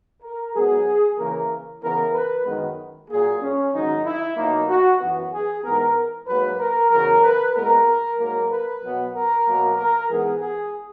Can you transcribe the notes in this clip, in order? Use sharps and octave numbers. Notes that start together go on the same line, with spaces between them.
A#4
G#2 F#3 B3 G#4
C#3 E3 A#3 A#4
C#3 E3 B3 A#4
B4
F#2 D#3 G#3 B3
A#2 F#3 A#3 G#4
C#4
G#2 D#3 F#3 D#4
E4
B2 F#3 A#3 D#4
F#4
F#2 E3 B3
G#4
G#2 E3 B3 A#4
G#2 F#3 A#3 B4
A#4
E2 C#3 F#3 A#4
B4
A#2 G#3 B3 A#4
G#2 F#3 A#3 A#4
B4
B2 F#3 B3
A#4
B2 F#3 A#3
A#4
G#2 E3 G#3 B3 G#4
G#4